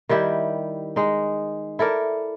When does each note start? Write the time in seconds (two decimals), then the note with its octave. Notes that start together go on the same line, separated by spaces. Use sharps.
0.09 D#3 G3 E4 G4
0.96 G#3 D#4
1.79 E4 A4 A#4 D5